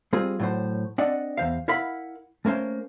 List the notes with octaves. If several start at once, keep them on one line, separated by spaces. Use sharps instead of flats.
G3 C4 F4 G#4
A2 F#3 C5
C4 D4 D5 D#5 F#5
E2 C5 F5
E4 A#4 F5 F#5 B5
A3 A#3 C#4 C5